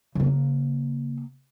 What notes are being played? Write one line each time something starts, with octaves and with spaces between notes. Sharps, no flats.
C#3 A#3